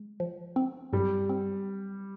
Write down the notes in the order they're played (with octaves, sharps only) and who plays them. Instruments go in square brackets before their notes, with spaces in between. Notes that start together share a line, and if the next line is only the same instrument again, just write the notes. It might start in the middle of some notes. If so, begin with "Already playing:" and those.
Already playing: [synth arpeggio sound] G#3
F3
C4
[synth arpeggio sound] G2 [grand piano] G3
[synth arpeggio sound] C4